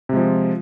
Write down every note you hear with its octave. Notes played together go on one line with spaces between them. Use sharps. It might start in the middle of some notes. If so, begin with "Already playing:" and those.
C3 F3 G#3